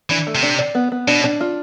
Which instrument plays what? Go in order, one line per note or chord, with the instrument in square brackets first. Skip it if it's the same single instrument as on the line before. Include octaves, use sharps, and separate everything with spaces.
[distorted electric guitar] E3 [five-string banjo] D4
[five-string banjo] A3
[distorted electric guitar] C3
[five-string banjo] D4
D5
B3
B3
[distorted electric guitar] B2 [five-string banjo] D4
[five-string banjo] D4
F4